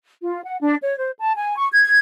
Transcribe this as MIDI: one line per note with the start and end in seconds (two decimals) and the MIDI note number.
0.23 0.43 65
0.44 0.58 78
0.60 0.75 62
0.81 0.95 73
0.97 1.11 72
1.20 1.34 81
1.36 1.55 80
1.57 1.66 85
1.72 1.99 92